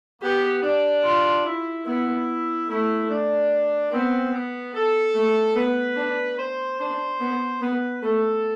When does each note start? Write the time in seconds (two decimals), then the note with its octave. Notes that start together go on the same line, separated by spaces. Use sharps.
0.22 B3 G4
0.63 D4
1.04 F4
1.45 E4
1.86 B3 E4
2.68 A3 E4
3.09 D4
3.92 B3 C4
4.33 B3
4.74 A4
5.14 A3
5.56 B3 B4
5.96 D4
6.38 C5
6.79 D4 C5
7.20 B3
7.61 B3 B4
8.02 A3 A4